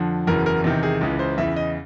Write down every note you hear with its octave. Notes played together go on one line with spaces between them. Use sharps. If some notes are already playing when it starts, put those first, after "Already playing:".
Already playing: F2 D3 F3
F#1 E2 C#3 E3 A#4
A#4
E2 C3 D#3
G#4
C#2 C#3 E3
C5
E2 C#3 E3 E5
D#5